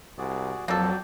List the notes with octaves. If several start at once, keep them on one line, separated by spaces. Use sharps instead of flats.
C2 F#4 G#4 D5
F2 F#3 A#3 A4 D5 G5